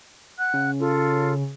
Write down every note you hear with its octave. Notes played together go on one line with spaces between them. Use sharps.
F#5 F#6
C#3
F4 A4